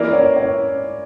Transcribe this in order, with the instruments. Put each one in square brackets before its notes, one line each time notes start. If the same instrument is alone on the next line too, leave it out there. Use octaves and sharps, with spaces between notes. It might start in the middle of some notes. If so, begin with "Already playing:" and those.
Already playing: [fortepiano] E3 A#3 E4 A#4 [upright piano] D5
[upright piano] C#5
C#5